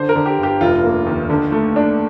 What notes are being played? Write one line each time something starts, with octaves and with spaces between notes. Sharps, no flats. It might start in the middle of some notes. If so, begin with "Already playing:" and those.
Already playing: D3 C5
A#4
D3
G4
G1
G4
F1 F4
A#3
D#2
D3
A3
D4